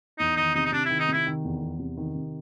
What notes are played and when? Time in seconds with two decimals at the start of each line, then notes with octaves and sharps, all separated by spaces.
0.19 E2 D#4
0.36 D#3 D#4
0.55 C3 D#4
0.65 D#4
0.72 C3 D4
0.85 D#3 E4
0.99 D#4
1.08 C3 E4
1.26 D#3
1.44 E2
1.62 E2
1.79 C3
1.97 D#3
2.15 C3